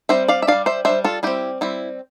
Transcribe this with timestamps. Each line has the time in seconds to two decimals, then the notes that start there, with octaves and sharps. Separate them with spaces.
0.09 G3 C4 C5 E5
0.28 D5 F5
0.42 E5
0.47 G3 D4 D5 F5
0.66 C5 E5
0.85 G3 D4 C5 E5
1.04 F4 A4
1.23 G3 C4 E4 G4
1.61 G3 C4 E4